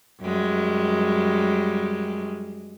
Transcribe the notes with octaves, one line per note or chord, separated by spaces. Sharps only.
F#2 G3 G#3